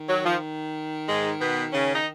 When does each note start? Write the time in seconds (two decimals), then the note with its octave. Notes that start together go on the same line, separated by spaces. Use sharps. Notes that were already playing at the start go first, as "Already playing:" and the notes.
Already playing: D#3
0.09 F#3
0.25 F3
1.08 G#2 G#3
1.40 B2 B3
1.73 C#3 C#4
1.95 D#4